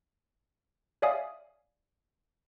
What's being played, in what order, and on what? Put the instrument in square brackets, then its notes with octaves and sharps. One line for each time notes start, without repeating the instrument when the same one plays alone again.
[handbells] C#5 D5 E5 F5 G#5 D#6